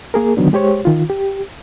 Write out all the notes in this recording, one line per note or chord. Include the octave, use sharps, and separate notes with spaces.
A#3 G#4 A#4
D3 D#3 F#3 B3 D4
G#3 G4 C5 C#5
D#3 F4
G4